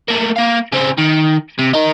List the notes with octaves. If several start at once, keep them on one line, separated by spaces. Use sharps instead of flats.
A3 A#3
A#3 F5
C#3 C4
D#3
C3
D#4 A#4